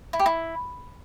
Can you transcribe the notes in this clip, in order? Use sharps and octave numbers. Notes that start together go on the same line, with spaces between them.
E4
G4
E4